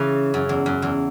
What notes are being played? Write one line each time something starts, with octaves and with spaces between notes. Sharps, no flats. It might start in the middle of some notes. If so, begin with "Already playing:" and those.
Already playing: C#3 E3
F#2
E2
F#2
E2